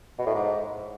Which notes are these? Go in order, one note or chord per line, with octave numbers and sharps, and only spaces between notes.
B2
A2
G#2